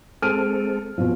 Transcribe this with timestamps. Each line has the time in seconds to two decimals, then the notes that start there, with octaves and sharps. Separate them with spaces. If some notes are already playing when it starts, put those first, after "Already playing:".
0.22 G#3 C4 A4 F6 D7 D#7
0.98 G2 B2 F3 C4